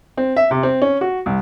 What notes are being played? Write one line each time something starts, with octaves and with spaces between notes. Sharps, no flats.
C4
E5
C3
C4
C#4
F#4
C2